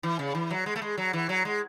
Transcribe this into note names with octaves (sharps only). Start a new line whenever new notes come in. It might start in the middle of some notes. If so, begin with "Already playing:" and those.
E3
C#3
E3
F#3
G#3
A3
G#3
F#3
E3
F#3
G#3